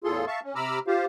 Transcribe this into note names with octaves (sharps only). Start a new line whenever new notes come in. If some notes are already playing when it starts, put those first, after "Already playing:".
E2 A2 F4 G#4 A4 C6
E5 F5 A5 C#6
C#4
C3 A#5 B5 D6 E6 F6
F4 G4 C5 F5